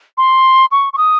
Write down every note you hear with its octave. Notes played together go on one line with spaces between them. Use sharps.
C6
C#6
C#6
D#6